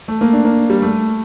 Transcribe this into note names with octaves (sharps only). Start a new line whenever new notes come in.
A3
A#3
D4
A#3
G3
A3